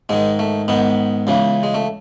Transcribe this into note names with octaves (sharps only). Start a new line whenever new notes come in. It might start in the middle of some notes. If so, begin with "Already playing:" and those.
G#2 D#3 G#3
A3
G#2 D#3 B3
C#2 C#3 E3
G#3
A3